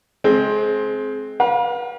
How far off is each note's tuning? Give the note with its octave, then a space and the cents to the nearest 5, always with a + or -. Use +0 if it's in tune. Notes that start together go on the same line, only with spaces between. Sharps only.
G#3 +30 C4 +10
B4 -35 F5 +30